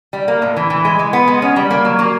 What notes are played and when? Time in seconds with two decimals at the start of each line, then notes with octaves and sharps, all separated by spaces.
0.13 G3
0.28 A#3
0.42 A2
0.57 E3
0.70 E3
0.85 G#3
0.99 G#3
1.13 B3
1.28 G#3
1.42 C#4
1.56 G3
1.71 A#3
1.85 F#3
1.99 A#3